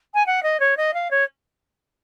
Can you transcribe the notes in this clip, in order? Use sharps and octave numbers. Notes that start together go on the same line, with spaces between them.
G#5
F#5
D#5
C#5
D#5
F5
C#5